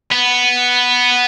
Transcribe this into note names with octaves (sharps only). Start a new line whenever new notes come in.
B3